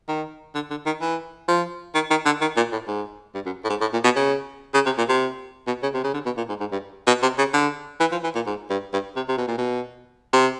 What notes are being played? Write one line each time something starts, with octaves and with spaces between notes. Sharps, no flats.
D#3
D3
D3
D#3
E3
F3
D#3
D#3
D3
D#3
A#2
A2
G#2
G2
F#2
A2
G#2
A2
A#2
B2
C#3
C#3
C3
A#2
C3
B2
C#3
C3
C#3
D3
B2
A#2
G#2
G#2
G2
B2
C3
C#3
D3
E3
F3
E3
A#2
G#2
G2
G2
C3
C3
B2
A#2
B2
C3